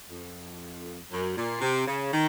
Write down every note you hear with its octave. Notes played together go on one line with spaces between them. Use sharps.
F2
F#2
A#2
C3
C#3
D#3